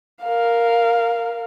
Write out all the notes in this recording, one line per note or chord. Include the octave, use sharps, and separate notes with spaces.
A#4 F5